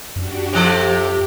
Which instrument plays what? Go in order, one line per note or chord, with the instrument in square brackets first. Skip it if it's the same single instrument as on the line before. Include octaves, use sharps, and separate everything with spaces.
[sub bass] F#2 [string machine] D4 F#4 G4
[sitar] C3 F3 A4 [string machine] G4